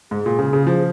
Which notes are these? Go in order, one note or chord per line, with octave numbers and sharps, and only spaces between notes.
G#2 G#4
A#2
C#3
C#3
F3